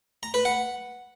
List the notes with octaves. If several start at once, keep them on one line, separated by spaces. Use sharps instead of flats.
A#5
B4
F#5